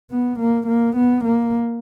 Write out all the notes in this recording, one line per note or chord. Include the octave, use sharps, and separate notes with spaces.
B3
A#3
A#3
B3
A#3